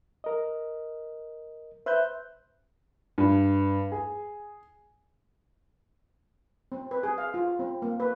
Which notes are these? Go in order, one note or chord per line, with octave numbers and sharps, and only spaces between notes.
A#4 D#5
B4 C5 E5 F#6 G6
G2
G#4
C4
B4
G#4
F5
F4
C4
A#3
B4